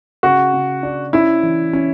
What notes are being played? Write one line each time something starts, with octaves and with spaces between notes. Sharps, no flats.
C#3 F#4
C#3
D4
C#4 E4
E3
C#4